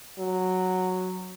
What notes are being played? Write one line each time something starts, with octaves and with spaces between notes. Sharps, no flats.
F#3